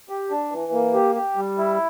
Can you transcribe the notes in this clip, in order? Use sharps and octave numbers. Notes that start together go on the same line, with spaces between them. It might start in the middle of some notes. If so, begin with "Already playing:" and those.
G4
D4
E3
A#3
G4
G4
G3
E4